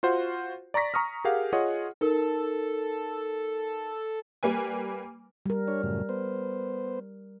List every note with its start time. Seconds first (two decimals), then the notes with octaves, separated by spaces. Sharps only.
0.03 F4 F#4 C5 F#5
0.74 D5 A#5 C#6 A#6 B6
0.94 A#5 C#6 D#6 F6
1.25 G4 G#4 A#4 F5 F#5
1.53 F4 G#4 C#5 D#5 F#5
2.01 D#4 A4 A#4
4.43 G3 A#3 B4 G#5
5.46 G3 A#4
5.68 D4 C#5
5.83 F#2 A2 C#3
6.09 B3 C5